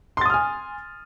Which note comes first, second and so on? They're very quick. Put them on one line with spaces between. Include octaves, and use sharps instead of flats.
C6 A6 D#6 F6 G#5